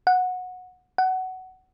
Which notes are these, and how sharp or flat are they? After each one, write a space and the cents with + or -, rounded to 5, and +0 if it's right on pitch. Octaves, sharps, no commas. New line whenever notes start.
F#5 -15
F#5 +15